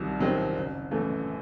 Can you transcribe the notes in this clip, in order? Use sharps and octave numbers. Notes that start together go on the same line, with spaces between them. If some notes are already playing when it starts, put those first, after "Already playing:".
Already playing: C2 C3 D#3 F#3
C3 D#3 F#3 C4
F#1
F#2 E3 A3